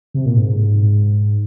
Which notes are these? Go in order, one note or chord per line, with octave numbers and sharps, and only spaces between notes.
C3
A#2
G#2